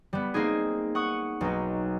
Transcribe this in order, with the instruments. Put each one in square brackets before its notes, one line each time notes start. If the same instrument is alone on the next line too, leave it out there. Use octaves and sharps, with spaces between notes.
[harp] G3 B3
A#3 C4 D#4 G#4
F#5 C#6 D#6
B1 D#4